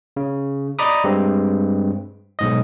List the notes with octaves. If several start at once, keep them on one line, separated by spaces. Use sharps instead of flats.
C#3
D5 D#5 A#5 B5 D6 D#6
G2 G#3 C4
B1 G#2 D#5